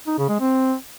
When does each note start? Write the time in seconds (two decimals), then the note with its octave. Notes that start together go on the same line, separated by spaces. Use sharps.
0.07 D#4
0.18 C#3
0.29 G#3
0.40 C4